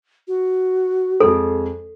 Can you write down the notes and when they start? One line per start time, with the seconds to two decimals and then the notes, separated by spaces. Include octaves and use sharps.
0.28 F#4
1.20 F2 G#3 A4